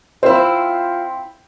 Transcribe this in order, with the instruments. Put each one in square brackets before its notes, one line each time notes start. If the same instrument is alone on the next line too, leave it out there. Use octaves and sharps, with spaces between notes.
[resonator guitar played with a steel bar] C4 E4 [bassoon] F4 [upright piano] C5